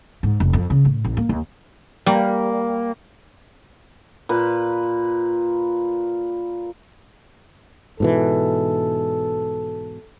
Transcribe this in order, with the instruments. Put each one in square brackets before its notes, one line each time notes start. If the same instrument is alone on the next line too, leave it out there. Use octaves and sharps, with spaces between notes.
[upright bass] G#2
F1
F2
C#3
A2
A1
A#3
D#2
[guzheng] G3 [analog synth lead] A#3
[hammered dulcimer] A#2 B4
[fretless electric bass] G#2 B2 E3 [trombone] A4